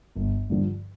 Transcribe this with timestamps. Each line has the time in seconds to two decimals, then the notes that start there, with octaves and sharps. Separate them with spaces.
0.16 G1
0.50 G2 D3 F3